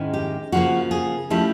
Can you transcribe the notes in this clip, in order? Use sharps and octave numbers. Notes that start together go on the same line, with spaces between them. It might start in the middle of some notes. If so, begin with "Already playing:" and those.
Already playing: G#2 D#3 G#3 C#4 E4
G4
C#3 F3 A#3 F#4
G#4
F3 A3 C#4 E4 G4